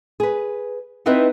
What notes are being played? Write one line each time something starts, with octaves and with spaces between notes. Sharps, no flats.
G#4 B4
B3 C4 D#4 E4 B4 D#5